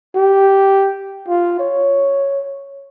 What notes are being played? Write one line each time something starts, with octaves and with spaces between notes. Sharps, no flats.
G4
F4
C#5